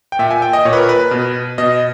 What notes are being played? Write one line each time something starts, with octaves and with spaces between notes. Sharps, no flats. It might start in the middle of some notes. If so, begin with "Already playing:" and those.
G5
A#2 E5
G#5
G5
D#5
A#2 C#5
B4
A#4
B4
B4
B2
B2 D#5